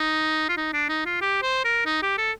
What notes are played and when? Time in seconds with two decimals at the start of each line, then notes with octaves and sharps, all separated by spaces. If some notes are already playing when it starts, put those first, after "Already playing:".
Already playing: D#4
0.49 F4
0.57 D#4
0.73 D4
0.89 D#4
1.05 F4
1.21 G4
1.42 C5
1.65 A#4
1.86 D#4
2.02 G4
2.18 A4